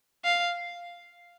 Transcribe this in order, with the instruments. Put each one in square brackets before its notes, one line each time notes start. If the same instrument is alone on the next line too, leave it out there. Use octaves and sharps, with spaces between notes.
[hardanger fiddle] F5